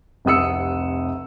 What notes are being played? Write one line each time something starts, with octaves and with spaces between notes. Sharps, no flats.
F1 C2 F#5 D#6 E6 C#7